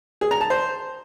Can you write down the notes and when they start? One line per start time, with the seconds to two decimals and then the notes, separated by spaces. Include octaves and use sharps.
0.21 G#4
0.31 A#5
0.41 A5
0.50 C5